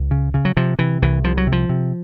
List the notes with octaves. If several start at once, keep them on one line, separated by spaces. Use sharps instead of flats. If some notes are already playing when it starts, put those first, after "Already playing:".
Already playing: C#2
C#3
C#3
F#3
C3 F3
C3 E3
C2 E3
C2 F3
F#3
C3
F3
C3